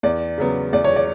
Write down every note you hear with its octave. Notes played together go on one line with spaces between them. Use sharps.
E2 D5
C#3 F#3 B3
E2 D5
C#5
D5